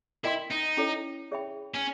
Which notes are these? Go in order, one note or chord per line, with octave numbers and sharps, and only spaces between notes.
E4 A#4 D#5 G5 C6
D#4
C#4 E4 A4 C#5
G#4 C#5 E5 G5 B5
C#4